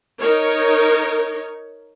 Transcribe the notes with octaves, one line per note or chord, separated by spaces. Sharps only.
D#4 A#4 C#5